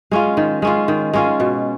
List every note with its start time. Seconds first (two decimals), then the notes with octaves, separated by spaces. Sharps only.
0.11 G#3 C#4 F4
0.37 D#3
0.62 G#3 C#4 F4
0.88 D#3
1.13 G#3 C#4 F4
1.40 B2